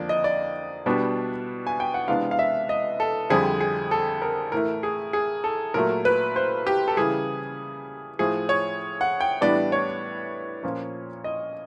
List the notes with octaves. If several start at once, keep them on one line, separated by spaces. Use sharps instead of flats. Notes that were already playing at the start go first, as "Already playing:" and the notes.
Already playing: F2 D3 F3 A#3 D4 D5
D#5
D5
B2 G3 B3 D4
G#5
G5
F#5
C3 E3 G#3 B3 D4 F5
F5
E5
D#5
A4
F2 D3 G3 C4 G#4
G#4
A4
A#4
A2 E3 A3 A#4
G#4
G#4
A4
A#2 F#3 A3 A#4
B4
C5
G4
A4
C#3 E3 G3 G#4
A2 F3 A3 G#4
C#5
F#5
G5
A2 E3 G3 B3 D4 D5
C#5
A#2 F3 A#3 C#4
D#5